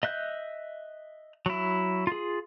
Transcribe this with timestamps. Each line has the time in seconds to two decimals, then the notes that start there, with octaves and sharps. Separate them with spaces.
0.03 D#5 E5 F#6 G6
1.46 F#3 E4
2.07 F4 G#4